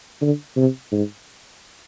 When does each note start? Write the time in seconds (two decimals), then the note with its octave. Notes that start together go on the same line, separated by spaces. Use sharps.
0.21 D3
0.56 C3
0.92 G#2